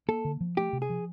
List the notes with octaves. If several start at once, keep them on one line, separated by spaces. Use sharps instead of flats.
A#3 A4
D3
F3
A3 G4
C3
G#4
F3